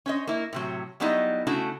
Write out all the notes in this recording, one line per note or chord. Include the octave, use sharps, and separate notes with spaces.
C#4 C5 D#5
A#3 E4
A2 C3 F#3
F#3 G3 B3 D#4 E4 D#5
C#3 A3 D4 E4 F#4